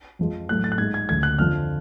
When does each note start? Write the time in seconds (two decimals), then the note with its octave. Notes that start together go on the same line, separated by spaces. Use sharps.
0.19 F2 F3 G#3
0.49 A2 F#3 A3 F#6
0.64 A6
0.72 F#6
0.78 G#2 G#3 G#6
0.94 G#6
1.08 D2 C#3 F3 A3 G#6
1.23 F#6
1.39 F2 D3 F3 F6